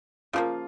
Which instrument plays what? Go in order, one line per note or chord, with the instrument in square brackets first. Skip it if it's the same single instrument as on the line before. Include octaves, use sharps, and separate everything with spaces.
[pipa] C#3 F3 A#3 [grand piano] F4